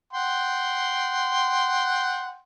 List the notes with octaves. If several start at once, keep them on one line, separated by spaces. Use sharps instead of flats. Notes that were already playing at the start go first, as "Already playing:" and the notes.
F#5 G5 C6